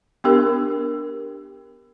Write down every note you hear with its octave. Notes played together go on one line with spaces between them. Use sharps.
B3 D4 G4 A#4